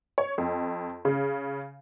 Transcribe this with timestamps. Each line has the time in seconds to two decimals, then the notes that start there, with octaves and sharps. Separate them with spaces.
0.18 C#5
0.38 F2
1.05 C#3